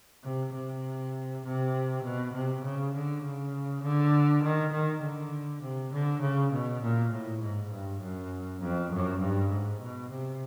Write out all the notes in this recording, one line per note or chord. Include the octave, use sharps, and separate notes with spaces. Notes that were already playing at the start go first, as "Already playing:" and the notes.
C3
C3
C3
B2
C3
C#3
D3
C#3
D3
D#3
D#3
D3
C3
D3
C#3
B2
A#2
A2
G#2
G2
F#2
F2
F#2
G2
G#2
B2
C3